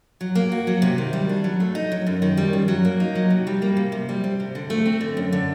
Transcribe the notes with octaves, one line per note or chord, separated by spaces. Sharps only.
F#3
A#3
F#4
F#3
C3
D#3
G3
D4
F#3
A3
D#4
F#3
F#2
D#3
G3
F#2
F#3
A#3
D#4
F#3
C3
G3
A#3
C3
C3
G3
C4
C3
D3
A3
C4
D3
F#2
D3